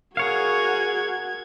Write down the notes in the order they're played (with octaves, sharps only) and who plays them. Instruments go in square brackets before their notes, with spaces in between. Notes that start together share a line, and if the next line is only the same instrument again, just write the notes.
[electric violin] F#4 G#6 [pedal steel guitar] G#4 C#5 F5 [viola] A#4 F#5